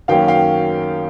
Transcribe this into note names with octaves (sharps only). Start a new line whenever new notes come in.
F#2 D#3 F#3 A#3 C#4 F5 G5
F5 G5